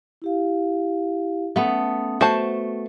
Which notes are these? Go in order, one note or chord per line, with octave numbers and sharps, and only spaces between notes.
E4 G4 F5
A3 B3 C#4 A5 D#6
A3 F#4 B4 C5 A5